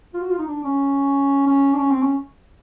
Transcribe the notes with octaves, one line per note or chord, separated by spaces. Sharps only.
F4
F#4
F4
D#4
D4
C#4
C#4
D4
C#4
C4
C#4